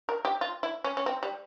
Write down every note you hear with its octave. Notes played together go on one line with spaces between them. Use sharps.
A#4
G4
F4
E4
C#4
C#4
C4
G3